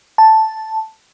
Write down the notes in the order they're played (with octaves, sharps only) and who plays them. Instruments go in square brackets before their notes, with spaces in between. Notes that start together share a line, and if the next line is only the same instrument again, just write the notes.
[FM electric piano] A5